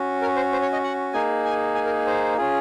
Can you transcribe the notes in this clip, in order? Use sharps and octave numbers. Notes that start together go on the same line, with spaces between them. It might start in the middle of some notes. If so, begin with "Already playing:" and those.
Already playing: C#4 F#4
A#4
C5
C5
C#5
D#5
F#5
A#3 D#4 G#4 G#5
G#5
G#5
A#4
C5
C#4 F4 G#4